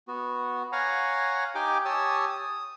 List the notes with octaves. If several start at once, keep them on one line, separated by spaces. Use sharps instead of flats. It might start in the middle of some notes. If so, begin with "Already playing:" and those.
B3 F#4
C#5 F5 F#5 G#5 A#5
D#4 G4 G5 G#5 D6
G4 C#5 G#5 A5 D#6 E6
D#6